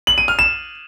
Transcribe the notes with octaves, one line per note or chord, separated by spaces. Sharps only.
F#7
D#7
F6
E7